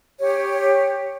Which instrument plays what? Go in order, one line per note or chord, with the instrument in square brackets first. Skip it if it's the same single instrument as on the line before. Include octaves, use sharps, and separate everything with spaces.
[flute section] G4 C#5